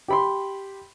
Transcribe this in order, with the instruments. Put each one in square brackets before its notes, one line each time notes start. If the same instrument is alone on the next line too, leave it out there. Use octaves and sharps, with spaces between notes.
[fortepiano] G4 B5 C6